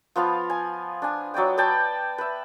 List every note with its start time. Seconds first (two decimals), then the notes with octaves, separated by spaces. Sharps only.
0.16 F3 B3 F4 F5
0.50 G#5
1.02 D4 G#5
1.34 F#3 D5 D#5 G5
1.57 B4 D5 G5 A5
2.18 B4 E5